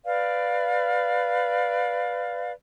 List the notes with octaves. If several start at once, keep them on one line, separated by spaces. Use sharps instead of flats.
B4 D5 F5